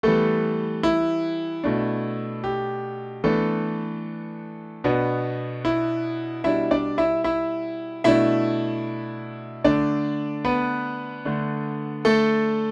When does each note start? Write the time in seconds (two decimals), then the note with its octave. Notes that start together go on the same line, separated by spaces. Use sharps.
0.03 E3 G3 A3 B3 A4
0.83 E4
1.64 B2 A3 D4
2.44 G4
3.24 E3 A3 B3 D4 A4
4.84 B2 B3 D4
5.65 E4
6.44 B2 G3 D4 E4 E5
6.71 D4 D5
6.98 E4 E5
7.24 E4 E5
8.04 B2 A3 D4 E4 E5
9.64 D3 A3 D4 D5
10.45 B3 B4
11.25 D3 A3 D4
12.05 A3 A4